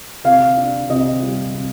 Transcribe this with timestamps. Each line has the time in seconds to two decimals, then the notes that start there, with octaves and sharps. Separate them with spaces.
0.24 C3 F5
0.57 D4
0.89 C3 D#5
1.23 G3
1.54 C3